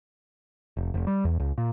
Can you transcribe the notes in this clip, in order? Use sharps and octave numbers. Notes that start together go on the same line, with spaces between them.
F1
F1
G3
E2
C#2
A#2